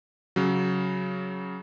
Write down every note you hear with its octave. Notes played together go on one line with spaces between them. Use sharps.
C#3 F#3